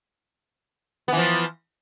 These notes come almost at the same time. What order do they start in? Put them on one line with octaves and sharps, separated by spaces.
B3 E3 F3